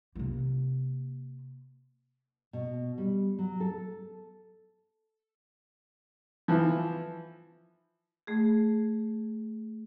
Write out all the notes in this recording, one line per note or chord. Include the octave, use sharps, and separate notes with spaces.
C3 A#3
B2
G3
F#3
A4
E3 F3
A3 G#4